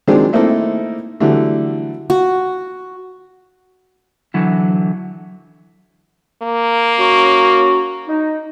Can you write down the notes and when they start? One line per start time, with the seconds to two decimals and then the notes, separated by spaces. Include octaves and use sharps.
0.07 D#3 F3 F#3 G#3 C4 D4
0.33 A3 A#3 C4 D#4 E4 A4
1.20 D3 E3 F#3 G3 A3
2.10 F#4
4.34 D3 E3 F#3 E4
6.43 A#3
6.98 C#4 F#4
8.07 D#4